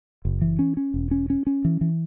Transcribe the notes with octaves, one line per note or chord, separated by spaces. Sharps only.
F#1
E3
C#4
C#4
E1
C#4
C#4
C#4
E3
E3